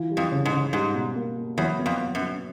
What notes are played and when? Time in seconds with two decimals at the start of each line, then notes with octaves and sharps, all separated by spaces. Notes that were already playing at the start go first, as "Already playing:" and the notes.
Already playing: E3 F4
0.10 G3
0.17 F2
0.32 C#3
0.45 G#2
0.52 C#3
0.73 G#2 G3
0.94 B2
1.15 A#3
1.37 A#3
1.58 E2 F#3
1.79 B3
1.86 F2
2.00 B3
2.15 F#2
2.21 F#3